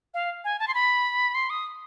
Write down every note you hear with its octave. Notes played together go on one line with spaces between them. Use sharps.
F5
G#5
A5
C6
B5
C6
D#6